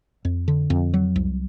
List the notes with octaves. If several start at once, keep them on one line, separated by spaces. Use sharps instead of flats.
F2
D3
F2
F#3
C2